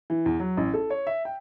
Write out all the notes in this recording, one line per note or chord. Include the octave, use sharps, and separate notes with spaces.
E3
E2
F#3
A1
A4
C#5
E5
G5